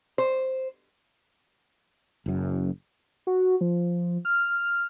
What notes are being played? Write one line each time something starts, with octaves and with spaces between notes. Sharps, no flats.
C5
F#1 F#2
F#4
F3
F6